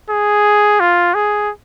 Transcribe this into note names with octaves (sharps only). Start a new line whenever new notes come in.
G#4
F4
G#4